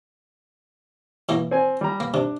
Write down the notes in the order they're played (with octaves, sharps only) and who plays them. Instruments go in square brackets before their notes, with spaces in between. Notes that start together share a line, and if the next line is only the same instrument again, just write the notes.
[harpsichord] B2 E3 A#3
[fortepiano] C4 G#5
G3 A#5
[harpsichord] A#3
[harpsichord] C3 [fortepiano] D4